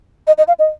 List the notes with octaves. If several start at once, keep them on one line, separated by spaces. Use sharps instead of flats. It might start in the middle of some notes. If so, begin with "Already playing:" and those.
D#5
D#5
F5
D#5